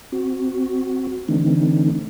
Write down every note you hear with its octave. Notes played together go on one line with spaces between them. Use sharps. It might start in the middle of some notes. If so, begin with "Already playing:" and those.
C4 F#4
D3 E3 A3 C4 D4 D#4